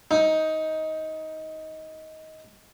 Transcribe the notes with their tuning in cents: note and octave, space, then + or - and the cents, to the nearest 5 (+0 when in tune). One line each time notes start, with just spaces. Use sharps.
D#4 +15